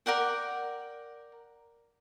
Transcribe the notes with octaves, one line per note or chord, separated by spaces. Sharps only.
A#4 D5 F#5 G5